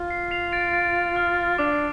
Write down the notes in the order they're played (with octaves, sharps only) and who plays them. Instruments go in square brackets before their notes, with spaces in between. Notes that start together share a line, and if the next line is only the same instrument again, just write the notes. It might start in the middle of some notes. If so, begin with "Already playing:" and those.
Already playing: [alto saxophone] F4
[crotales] C7
C7 F7
A6 D7
A6 D7
F6
[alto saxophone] D4 [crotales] D6